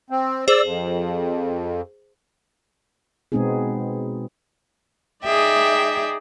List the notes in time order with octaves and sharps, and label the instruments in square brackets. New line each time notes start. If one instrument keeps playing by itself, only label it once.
[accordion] C4
[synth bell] G#4 C5 [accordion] D5 E6
[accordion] F2
[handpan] B2 G#3 B3 C4 D#4 G#4
[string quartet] D#4 G#4 D5 E5 G5